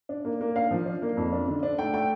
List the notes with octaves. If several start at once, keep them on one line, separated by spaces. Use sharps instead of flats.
D4
A#3
A#3
D4 F5
F3
D4
A#3
F2
D4
D3
D4
A3 G5
A3 G5